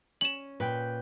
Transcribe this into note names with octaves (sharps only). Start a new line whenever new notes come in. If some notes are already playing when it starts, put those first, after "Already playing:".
C#4 E7 F#7
A#2 B4 G5